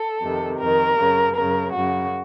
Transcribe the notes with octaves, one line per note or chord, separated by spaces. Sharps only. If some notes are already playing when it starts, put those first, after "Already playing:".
Already playing: A4
F2 C3 D#3
F2 D#3 A#4
F#2 C#3
F#2 C#3 A#4
F#2 C#3 F#4